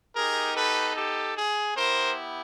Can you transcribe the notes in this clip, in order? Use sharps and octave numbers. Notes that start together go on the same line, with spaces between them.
B3 D#4 G4 G#4 A#4
A4 B4
G4 A4
G#4
B3 E4 G4 A#4 C5